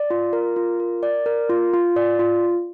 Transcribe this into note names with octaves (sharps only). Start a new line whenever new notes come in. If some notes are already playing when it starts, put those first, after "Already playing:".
Already playing: D5
F4
A#4
F4
A#4
D5
A#4
F4
F4
D5
F4